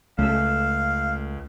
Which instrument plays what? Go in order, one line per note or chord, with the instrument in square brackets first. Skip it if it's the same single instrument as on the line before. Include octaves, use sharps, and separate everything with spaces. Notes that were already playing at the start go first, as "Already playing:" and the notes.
[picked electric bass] C#2 [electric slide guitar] A3 A4 [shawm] F5